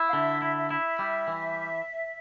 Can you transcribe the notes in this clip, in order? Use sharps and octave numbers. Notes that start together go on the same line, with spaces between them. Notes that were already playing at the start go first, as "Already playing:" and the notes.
Already playing: E4
F5
D3 E5
E4
E5
E4
G3
E3